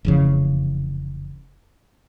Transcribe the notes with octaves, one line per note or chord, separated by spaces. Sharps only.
F1 E2 C#3